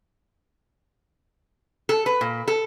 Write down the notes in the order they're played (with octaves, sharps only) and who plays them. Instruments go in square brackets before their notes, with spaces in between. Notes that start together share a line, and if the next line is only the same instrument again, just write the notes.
[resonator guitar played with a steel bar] A4
B4
A#2
A4